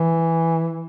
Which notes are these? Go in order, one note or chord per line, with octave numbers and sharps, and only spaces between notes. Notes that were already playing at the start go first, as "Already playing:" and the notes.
Already playing: E3